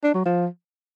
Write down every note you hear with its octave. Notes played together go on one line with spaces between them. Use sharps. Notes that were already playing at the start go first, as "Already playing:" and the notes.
D4
F#3
F3